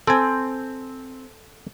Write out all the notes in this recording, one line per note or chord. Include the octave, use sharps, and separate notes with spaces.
C4 A4 G#5